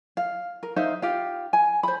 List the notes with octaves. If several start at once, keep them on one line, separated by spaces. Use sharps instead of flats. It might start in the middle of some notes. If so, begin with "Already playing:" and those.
F5
A#4
D#4 C5 E5 F5
F4 G4 F5
G#5
C5 B5